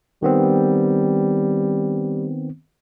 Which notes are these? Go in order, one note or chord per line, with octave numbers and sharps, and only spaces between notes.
D#3 G3 B3 C4